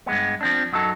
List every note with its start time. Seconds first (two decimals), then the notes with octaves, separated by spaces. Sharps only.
0.06 G2 G#3 B3
0.41 F3 C4 D4
0.73 F#2 F#3 D#4 A4